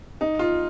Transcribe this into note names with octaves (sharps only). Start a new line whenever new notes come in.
D#4
F4